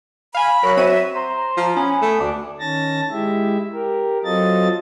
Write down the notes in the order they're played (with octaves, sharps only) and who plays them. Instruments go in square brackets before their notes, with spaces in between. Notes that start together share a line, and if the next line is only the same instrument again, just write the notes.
[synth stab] F5 G#5 [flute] B5
[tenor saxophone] F#3 [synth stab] A#4 F#6
[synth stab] C4 F#4 D#7 [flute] E5
[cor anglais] C5 [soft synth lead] A#5
[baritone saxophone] F3
[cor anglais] B3 [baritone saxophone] C#4 [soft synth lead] G#5
[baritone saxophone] A3
[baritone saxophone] D2 [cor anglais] D4 [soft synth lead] D6
[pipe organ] D#3 C#4 A5 A6 A#6
G#3 E4 G4 E5
G4 A#4
F#3 C4 F4 A4 D#5 A6